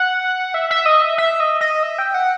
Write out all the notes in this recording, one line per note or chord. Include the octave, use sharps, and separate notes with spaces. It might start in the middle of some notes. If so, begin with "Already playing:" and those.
Already playing: F#5
E5
E5
D#5
E5
E5
D#5
D#5
E5
G5
F#5